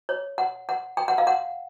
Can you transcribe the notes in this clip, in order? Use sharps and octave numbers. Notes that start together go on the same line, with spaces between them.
C#5
F#5
F#5
G5
F#5
F5
F#5